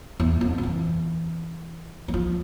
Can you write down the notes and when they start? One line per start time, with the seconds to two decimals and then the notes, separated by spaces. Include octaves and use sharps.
0.20 E2
0.41 F2
0.58 F3
0.63 E3
2.08 G#3
2.14 F3